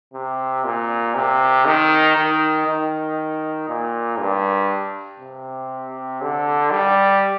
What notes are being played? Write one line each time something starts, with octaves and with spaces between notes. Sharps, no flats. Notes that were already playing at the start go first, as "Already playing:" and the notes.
C3
A#2
C3
D#3
D#3
D#3
A#2
G2
C3
D3
G3